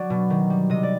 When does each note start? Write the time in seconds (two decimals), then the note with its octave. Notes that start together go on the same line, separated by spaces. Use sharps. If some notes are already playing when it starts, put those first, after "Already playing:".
Already playing: F#3 D5
0.10 B2
0.30 D#3
0.50 G3
0.70 C3 D#5
0.83 D5